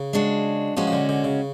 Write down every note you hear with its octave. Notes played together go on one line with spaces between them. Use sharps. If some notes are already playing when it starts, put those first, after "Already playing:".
Already playing: C#3
G#3 D4 F#4
F3 G#3 C#4 F#4
F3
D3
D3
C#3